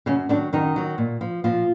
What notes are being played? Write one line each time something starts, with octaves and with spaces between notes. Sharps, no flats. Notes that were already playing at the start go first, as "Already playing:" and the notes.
F#2 C#3 C#4
D3 D#3 F#3 D4
F#2 D#3 D#4
D#3 F#3
A#2
F3
A#2 F3 F4